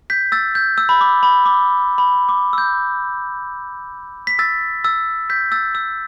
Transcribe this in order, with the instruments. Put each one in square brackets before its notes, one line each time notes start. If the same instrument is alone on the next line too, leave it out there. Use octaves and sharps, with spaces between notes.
[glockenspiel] G6 B6
E6 A6
G6
E6
B5
D6
B5
D6
B5
D6
E6
G6
B6
E6 A6
E6 A6
G6 B6
E6 A6
E6